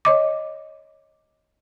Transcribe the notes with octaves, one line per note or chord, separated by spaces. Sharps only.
C#5 D#5 D6